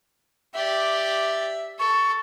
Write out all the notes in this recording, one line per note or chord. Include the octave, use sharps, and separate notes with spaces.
G4 D5 E5
A4 C#6